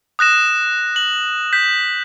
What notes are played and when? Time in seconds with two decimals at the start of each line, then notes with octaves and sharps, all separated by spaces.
0.19 D#6 F#6 A#6 E7
0.96 F#7
1.53 G6 B6